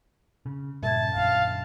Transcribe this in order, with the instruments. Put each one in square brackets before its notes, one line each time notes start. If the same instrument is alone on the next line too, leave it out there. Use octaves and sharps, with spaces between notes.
[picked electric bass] C#3
[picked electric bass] G2 A#2 C#3 [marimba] E5 G#6 [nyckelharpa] A5
[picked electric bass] A#1 F#2 D3 [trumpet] F5